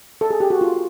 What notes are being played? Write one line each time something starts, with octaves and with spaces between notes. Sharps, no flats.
A4
G#4
G4
F#4
F4